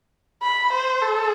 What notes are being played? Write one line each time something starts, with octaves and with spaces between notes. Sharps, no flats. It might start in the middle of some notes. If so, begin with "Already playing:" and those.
B5
C5
A4